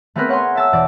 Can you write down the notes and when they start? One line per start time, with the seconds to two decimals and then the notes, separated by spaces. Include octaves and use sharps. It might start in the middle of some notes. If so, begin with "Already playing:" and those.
0.16 A3 B3 C4 G#4 A#4 B4
0.29 C#5 F#5 G#5 C6
0.55 E5 A5 E6
0.72 E1 D5